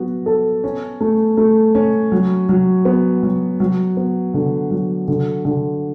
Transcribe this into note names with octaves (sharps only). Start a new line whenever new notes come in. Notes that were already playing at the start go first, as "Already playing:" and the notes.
Already playing: F#3 B3 F#4
A4
C#4
A3
A3
C#4
F#3
F#3
B3
F#3
F#3
B3
D3
F#3
D3
D3